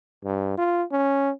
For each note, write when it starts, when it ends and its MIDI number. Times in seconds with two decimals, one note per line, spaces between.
0.25 0.53 43
0.58 0.83 65
0.92 1.31 61